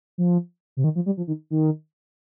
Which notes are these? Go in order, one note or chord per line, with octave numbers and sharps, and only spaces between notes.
F3
C3
D#3
F3
G3
F3
D#3
D#3